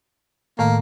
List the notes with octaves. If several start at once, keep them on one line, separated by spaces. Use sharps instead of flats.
A2 D#3 A3 A#3